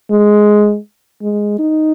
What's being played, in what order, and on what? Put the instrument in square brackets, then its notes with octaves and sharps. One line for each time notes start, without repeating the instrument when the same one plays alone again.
[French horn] G#3
G#3
D#4